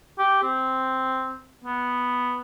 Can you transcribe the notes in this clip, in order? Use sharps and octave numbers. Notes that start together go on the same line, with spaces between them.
G4
C4
B3